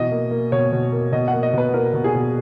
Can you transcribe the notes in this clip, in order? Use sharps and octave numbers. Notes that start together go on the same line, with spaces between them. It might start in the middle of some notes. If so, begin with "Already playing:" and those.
Already playing: B2 E3 D#5
A#3
A#3
B2 C#5
B2
A#3
B2 D#5
F#5
A#3
D#5
B2 B4
A#3 A#4
B2
G#4
B2